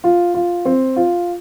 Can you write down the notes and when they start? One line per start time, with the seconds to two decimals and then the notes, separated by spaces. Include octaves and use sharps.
0.04 F4
0.34 F4
0.65 C4
0.96 F4